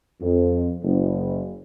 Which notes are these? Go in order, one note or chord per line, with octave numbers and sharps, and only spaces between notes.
F2
F#1